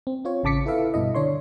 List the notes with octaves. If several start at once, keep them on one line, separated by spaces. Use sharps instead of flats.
C4
C4 F4 C#5
A1 C#3 A5 D6 B6 C#7
E4 A4 B4 E5 F5
G2 B2 E4 D#5
D3 D4 C#5 C6